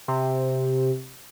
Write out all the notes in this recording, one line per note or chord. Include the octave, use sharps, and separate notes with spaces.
C3